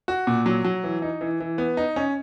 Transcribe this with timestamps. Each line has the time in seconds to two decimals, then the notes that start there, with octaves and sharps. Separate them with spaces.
0.08 F#4
0.27 A#2
0.46 F#3
0.64 F#3
0.84 E3
1.02 D#4
1.21 E3
1.40 E3
1.58 B3
1.77 D#4
1.96 C#4